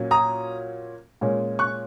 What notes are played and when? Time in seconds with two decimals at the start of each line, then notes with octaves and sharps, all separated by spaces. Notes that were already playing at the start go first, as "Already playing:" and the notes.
Already playing: A#2 F#3 C#4
0.11 A#5 D#6
1.21 A#2 G#3 C#4
1.59 C#6 F#6